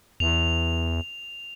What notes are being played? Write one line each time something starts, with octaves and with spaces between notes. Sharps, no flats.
E2 F7